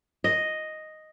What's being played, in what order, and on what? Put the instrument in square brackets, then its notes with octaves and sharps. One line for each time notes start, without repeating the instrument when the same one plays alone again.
[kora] D#5